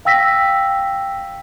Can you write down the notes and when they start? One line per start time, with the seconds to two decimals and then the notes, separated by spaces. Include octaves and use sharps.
0.05 F5 G5 E6 A#6 B6